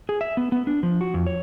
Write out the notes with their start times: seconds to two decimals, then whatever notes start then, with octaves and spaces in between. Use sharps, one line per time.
0.09 G#4
0.21 E5
0.37 B3
0.52 B3
0.67 D4
0.83 F3
1.01 F#4
1.14 F2
1.27 C#5